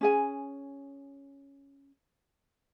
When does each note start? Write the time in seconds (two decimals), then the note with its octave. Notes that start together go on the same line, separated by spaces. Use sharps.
0.01 C#4 G#4 G#5